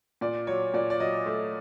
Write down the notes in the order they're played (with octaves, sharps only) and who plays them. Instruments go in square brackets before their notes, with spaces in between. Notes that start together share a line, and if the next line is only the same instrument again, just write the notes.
[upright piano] A#2 [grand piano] D5
[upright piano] F#3 [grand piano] C#5
[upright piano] A#2 [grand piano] D5
[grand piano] D5
[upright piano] F#3 [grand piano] D#5
[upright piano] A3